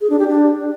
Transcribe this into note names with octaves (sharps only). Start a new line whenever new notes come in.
G#4
D4
G4
D4